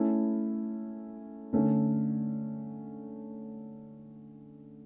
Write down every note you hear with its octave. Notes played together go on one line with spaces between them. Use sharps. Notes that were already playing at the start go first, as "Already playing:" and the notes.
Already playing: A3 C#4 E4
D3 A3 C#4